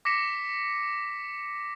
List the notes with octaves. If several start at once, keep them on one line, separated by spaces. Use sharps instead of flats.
D6 A#6 B6 C#7 E7